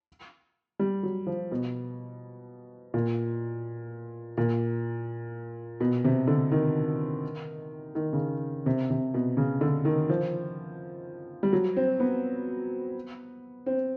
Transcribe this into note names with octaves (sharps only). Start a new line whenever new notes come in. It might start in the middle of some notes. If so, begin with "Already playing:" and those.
G3
F#3
F3
B2
A#2
A#2
B2
C3
D3
D#3
D#3
C#3
C3
C3
B2
C#3
D3
D#3
F3
G3
F#3
C4
B3
C4